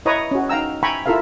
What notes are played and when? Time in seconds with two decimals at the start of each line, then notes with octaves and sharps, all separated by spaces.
0.06 E4 B4 C#5 D#5 A#5 D#6
0.31 C#4 F#4
0.49 D#4 F5 G5 A#5 E6
0.83 E5 G5 G#5 A#5 B5 C#6
1.06 E4 F4 A4 A#4 E5 F5